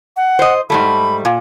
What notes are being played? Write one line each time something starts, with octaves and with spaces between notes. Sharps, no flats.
F#5
C5 D#5
G#2 G3 A3 B5
A#2